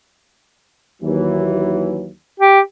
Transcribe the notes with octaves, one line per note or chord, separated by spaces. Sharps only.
D#2 E3 F#3
G4